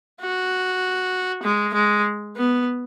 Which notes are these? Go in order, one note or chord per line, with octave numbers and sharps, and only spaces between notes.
F#4
G#3
G#3
B3